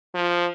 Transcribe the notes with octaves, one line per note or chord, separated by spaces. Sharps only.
F3